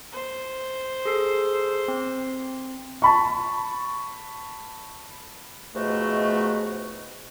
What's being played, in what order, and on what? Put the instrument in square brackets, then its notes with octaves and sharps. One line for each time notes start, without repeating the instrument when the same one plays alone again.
[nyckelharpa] C5
[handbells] G#4 A4 C7
C4
[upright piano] A5 B5 C#6
[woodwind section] D#2 G#2 B2 F3 A3 F#4